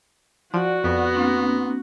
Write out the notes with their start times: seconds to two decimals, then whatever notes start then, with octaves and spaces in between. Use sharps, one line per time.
0.54 F3 F#4 D5 F#5
0.84 F2 B3
1.15 A#3 C4 D4